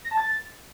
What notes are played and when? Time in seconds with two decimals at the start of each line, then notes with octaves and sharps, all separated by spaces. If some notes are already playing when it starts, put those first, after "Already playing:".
0.05 A#6
0.11 A5
0.18 A6